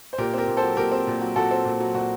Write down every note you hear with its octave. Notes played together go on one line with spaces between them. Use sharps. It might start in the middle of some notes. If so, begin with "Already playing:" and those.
C5
A#2 G4 A#4
C4 G4 A#4
A#2
A4 C5
F#3
A#2 G4 A#4
C4
A#2
F#3
A#2 F#4 A4
C4
A#2
F#3
A#2 F#4